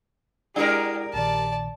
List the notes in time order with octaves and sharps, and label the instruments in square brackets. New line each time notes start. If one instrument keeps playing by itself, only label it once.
[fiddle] G#3 [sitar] D4 G4 A#4 [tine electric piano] E4 F#5
[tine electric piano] A#1 A#2 D#3 [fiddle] D5 A5